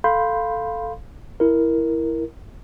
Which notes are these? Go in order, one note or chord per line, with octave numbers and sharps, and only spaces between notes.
A4 F5 B5 C6 G6
E4 A#4